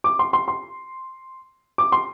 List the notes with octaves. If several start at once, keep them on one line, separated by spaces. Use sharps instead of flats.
D6
C6
C6
C6
D6
C6